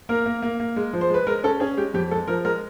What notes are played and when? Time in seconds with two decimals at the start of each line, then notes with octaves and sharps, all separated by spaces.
0.09 A#3 A#4
0.26 A#3
0.42 A#3
0.60 A#3
0.76 G#3
0.93 F3
1.01 C5
1.10 G#3 B4
1.27 G#3 A#4
1.44 C#4 A4
1.60 C#4 G#4
1.77 G#3 G4
1.94 F2 G4
2.11 G#3 A4
2.28 F3 A#4
2.45 G#3 A#4